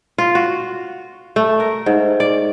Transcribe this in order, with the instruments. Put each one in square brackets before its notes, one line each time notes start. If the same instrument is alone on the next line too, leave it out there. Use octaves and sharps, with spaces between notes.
[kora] F4
F#4
A3
A#4
G#2
D5